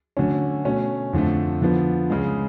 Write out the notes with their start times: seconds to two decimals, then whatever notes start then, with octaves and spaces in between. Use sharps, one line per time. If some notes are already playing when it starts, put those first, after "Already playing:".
0.17 D3 F#3 A3 C#4
0.65 B2 A3 C#4
1.13 F2 D3 F3 A3
1.62 D3 F3 B3
2.10 C#2 C#3 G#3